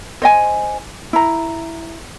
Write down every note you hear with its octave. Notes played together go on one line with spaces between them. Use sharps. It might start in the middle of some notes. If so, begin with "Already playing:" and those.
C5 D#5 G#5
E4 A#5